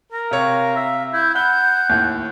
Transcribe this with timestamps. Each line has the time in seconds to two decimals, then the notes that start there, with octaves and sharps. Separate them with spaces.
0.13 A#4
0.31 C3 C#5 F5
0.77 E5
1.13 E4 G6
1.35 F#5 B5 G6 G7
1.89 D#2 A2